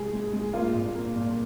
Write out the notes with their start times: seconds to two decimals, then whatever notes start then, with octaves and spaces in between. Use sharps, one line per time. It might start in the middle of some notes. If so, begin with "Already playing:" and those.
Already playing: C2 G3 G#3 G#4
0.13 G#3
0.33 G#3
0.53 A#3 F4
0.74 A#2
0.95 A#3
1.16 A#2